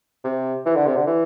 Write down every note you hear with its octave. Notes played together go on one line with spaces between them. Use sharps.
C3
E3
D3
C3
D3
E3